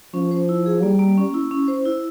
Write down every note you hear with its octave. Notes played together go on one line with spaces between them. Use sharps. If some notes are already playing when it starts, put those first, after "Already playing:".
F3 C#4
C5
E4
G#4
G3 A#3
A#3
C#4
E4
C#4
C5
E4